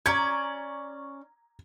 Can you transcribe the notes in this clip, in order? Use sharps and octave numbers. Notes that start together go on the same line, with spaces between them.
C#4 D5 A#5 G#6